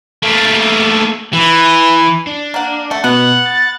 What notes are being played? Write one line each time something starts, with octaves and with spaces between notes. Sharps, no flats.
A3 A#3
E3
D4
A#3 F#5
A3 F#5
B2 B3 F#6
A6